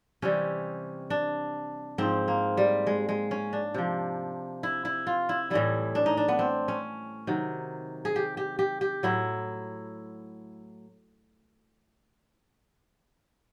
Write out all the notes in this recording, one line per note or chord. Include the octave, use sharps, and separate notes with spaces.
C3 E3 G3 C#4
D4
G#2 F3 C4
A#3
G3
G#3
G#3
C#4
D4
C3 F3
E4
E4
F4
E4
A2 E3 G3 E4
D4
D#4
D4
B3
C4
C#4
C3 D#3 F#3
G#4
G4
G4
G4
G4
A2 F#3 E4